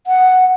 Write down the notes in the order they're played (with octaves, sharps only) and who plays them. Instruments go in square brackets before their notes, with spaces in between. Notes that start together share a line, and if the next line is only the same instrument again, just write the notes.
[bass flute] F#5